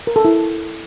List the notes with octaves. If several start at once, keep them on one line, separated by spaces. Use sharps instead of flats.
A#4
A4
E4